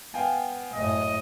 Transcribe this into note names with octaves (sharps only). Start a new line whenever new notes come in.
B3 F5 G5 G#5
F#1 A2 D#5